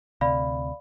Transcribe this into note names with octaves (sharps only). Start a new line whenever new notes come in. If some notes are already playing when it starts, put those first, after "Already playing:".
D2 C3 D5 F5 B5